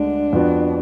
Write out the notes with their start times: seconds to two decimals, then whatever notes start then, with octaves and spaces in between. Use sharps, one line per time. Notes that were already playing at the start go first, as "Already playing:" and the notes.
Already playing: D2 D3 G#3 D4
0.33 F2 F3 B3 F#4